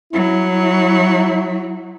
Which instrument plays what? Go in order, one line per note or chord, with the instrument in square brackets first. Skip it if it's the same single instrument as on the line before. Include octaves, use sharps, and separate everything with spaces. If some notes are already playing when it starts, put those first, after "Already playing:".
[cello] F#3 [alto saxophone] E4